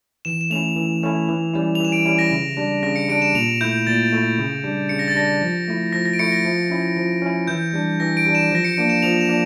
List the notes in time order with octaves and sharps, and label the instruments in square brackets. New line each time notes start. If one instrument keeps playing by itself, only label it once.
[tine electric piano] E3 [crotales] E7
[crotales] E7
[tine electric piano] A3 C#4 E4 [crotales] F7
[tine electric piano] E3
A3 C#4 E4
E3
G3 C#4 E4
[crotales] F7
[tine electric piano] E3 [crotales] E7
[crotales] D7
[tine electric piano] G3 C#4 E4 [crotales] D7
[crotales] A#6
[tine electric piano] C#3
G3 D4
[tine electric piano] C#3 [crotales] A#6
[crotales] C#7
[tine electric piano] G3 D4 [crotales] D7
[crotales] E7
[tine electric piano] A#2 [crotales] F7
[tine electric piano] A3 E4 [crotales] G6
[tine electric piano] A#2 [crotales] A6
[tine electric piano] A3 E4
C#3
G3 D4
[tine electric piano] C#3 [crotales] C#7
[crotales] A#6
A6
[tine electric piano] G3 D4 [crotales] A#6
[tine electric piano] F3
A3 E4
[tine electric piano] F3 [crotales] A#6
[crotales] A#6
D7
[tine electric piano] A3 E4 [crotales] C#7
[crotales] A#6
[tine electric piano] F3
C#4 E4
F3
C#4 E4
[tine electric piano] E3 [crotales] G6
[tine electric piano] G3 D4
[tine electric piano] E3 [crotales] A#6
[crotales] D7
[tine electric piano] G3 D4
[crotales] E7
[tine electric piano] F3 [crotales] A#6
[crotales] C#7
[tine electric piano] A#3 D4 [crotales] D7
[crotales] E7
[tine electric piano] F3 [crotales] F7
[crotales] E7
[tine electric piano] A#3 D4